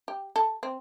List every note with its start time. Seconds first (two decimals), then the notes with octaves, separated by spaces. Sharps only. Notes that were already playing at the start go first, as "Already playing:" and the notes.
0.08 G4
0.36 A4
0.63 C4